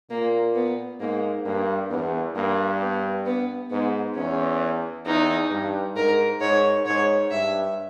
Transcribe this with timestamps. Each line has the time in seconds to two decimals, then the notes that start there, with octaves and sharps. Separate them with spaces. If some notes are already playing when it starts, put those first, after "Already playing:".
0.10 A#2 A#3
0.55 B3
1.00 G#2 A#3
1.45 G2 A#3
1.90 E2 B3
2.35 G2 A#3
2.81 B3
3.26 B3
3.70 G#2 B3
4.16 E2 C#4
5.05 E2 D#4
5.51 G2
5.95 G#2 A#4
6.40 G#2 C#5
6.86 G#2 C#5
7.31 G2 E5